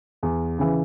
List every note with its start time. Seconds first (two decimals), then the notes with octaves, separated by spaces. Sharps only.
0.23 E2
0.59 C#3 E3